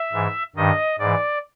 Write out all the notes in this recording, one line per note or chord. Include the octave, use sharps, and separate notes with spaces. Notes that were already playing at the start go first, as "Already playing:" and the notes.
Already playing: E5
G#2 E3
G2 D#3 D#5
G#2 E3 D5